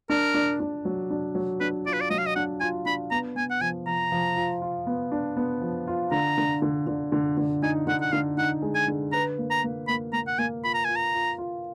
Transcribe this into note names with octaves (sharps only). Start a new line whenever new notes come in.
D4 A#4
D4
D4
F#3
D4
F#3
D4 B4
F4 D5
B4
D5
F#3 D#5
F5
D#5
D4 F#5
F4 G#5
D4 B5
B3 A#5
B3 G#5
F#5
F3 G#5
F3 A#5
F3
F4
F4
B3
D4
B3
F3
F4
D3 A#5
D3
D3
D3
D3
D3
D#4 G#5
D3 F#5
F#5
D3 F5
D#4 F#5
G#3
G#5
D3
B4 A#5
A#3
A#5
A#3
A#3 B5
A#3 A#5
F#5
A#3 G#5
F4 B5
A#5
F4 G#5
A#5
F4
F4